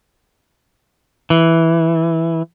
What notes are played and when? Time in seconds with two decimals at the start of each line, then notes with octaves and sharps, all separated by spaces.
1.30 E3